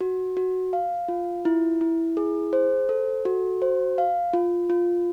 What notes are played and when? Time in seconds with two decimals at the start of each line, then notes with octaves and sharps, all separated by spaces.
0.01 F#4
0.37 F#4
0.73 F5
1.08 F4
1.45 E4
1.81 E4
2.17 G#4
2.53 C5
2.89 A4
3.25 F#4
3.62 C5
3.98 F5
4.33 F4
4.70 F4